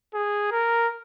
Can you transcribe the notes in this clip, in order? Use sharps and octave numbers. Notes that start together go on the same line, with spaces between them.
G#4
A#4